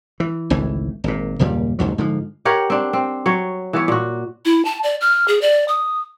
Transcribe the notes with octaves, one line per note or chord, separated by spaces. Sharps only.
E3
G#1 C#2 A2 E3
G#1 A#2
F#1 D#2 A#2 G3
F#1 D#2 G#2 F#3
G#2 D3 F3
G4 A#4 C#5 F#5
C4 D4
C4
F#3 C#5
E3 B3 C#5
A#2 F#4
E4
A5
D5
F6
G#4
D5
D#6